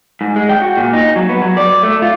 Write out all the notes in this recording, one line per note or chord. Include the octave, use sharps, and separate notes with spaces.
G#2
G#3
G5
F#4
A#2
D#4
F#3
B3
F#3
D5
A3
F4